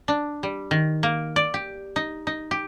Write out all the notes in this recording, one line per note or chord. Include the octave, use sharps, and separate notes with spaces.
D4
G3
D#3
A#3
D5
G4
D#4
D#4
G4